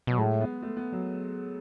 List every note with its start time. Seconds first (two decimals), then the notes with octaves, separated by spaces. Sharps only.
0.07 B2 F#3
0.18 A2 G#3
0.41 B3
0.62 A3
0.77 B3
0.92 F#3